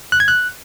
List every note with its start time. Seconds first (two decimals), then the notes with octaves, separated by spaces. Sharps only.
0.12 F#6
0.20 G#6
0.28 F#6